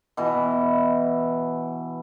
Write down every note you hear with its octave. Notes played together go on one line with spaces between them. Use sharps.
B2 E3